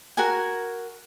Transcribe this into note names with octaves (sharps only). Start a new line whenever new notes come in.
F#4 A#4 G#5